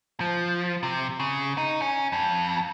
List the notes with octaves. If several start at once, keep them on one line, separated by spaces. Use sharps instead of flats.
F3
C3
C#3
D#4
C#4
F2